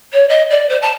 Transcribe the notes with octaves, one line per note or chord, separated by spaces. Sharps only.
C#5
D#5
D5
C5
A5